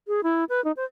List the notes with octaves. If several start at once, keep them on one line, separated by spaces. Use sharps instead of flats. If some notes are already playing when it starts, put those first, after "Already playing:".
G#4
E4
B4
D#4
C5